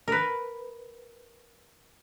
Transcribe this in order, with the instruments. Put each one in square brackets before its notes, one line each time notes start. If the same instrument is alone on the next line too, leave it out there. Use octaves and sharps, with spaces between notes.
[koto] A#4 B4